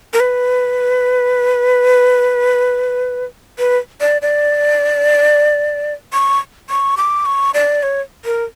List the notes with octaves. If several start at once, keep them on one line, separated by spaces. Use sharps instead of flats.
A#4
B4
B4
D5
D5
C#6
C#6
D6
C#6
D5
C#5
A#4